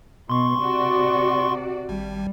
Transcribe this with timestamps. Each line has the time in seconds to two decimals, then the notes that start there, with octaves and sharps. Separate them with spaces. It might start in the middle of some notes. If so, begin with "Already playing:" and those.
0.30 B2 C6 C#6
0.61 C3 F#4 D5
1.89 G#1 G3